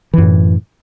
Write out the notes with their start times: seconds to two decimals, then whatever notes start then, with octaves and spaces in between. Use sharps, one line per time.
0.14 E3
0.18 F#2
0.22 A2